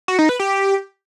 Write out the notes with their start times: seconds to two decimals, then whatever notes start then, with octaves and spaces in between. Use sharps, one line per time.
0.08 F#4
0.19 D#4
0.29 B4
0.40 G4